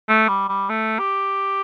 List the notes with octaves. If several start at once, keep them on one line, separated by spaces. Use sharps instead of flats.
A3
G3
G3
A3
G4